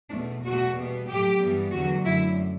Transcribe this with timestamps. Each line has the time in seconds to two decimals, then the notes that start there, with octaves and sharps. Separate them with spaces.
0.11 E2 B2 A3 D4
0.43 E2 B2 A3 F#4
0.75 B2 G3 B3
1.07 A2 F#3 A3 G4
1.40 G2 E3 G3 B3
1.72 E2 D3 F#3 A3 F#4
2.05 F#2 D3 A3 E4